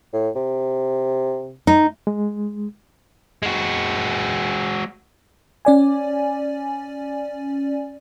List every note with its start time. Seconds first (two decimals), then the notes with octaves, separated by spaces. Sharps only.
0.13 A2
0.35 C3
1.67 D#4
2.07 G#3
3.43 G#3 F#4
5.65 C#4 D5 G#5